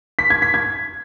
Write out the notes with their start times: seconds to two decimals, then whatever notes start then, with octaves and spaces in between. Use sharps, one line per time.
0.19 B6
0.30 G#6
0.42 B6
0.54 G#6